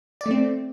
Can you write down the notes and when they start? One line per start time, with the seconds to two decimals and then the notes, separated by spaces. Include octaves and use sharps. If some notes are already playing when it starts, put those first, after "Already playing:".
0.21 D5
0.26 A3
0.31 C4